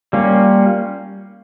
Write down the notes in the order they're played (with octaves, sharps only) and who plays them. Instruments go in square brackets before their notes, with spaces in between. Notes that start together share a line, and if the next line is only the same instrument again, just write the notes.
[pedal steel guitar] G3 A#3 C#4 F4